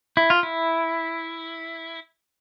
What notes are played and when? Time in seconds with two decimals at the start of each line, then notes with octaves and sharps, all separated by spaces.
0.17 E4
0.30 F4
0.43 E4